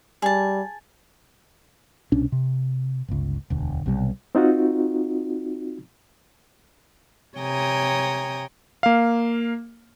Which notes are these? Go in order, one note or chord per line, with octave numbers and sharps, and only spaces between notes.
G3 G#4 A5
C2 B2 C#4 D4
C3
G1 C#2
E1 D2
B1 C3 F3 G3
C4 D#4 F4 F#4
C3 C#5 G5 G#5 A#5 D#6
A#3 F5